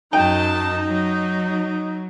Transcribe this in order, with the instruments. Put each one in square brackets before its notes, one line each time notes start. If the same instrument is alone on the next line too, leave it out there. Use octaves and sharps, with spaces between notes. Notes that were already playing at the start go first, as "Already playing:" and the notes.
[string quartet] F#2 F#3 A5 [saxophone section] D#4 [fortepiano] G5
[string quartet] F#3